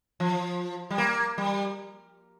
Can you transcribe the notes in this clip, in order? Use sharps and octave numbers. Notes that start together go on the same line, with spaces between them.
F3
G3
A#3
G3